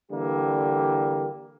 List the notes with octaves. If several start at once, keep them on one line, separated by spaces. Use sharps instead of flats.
D3 E3 G3 A#3 G4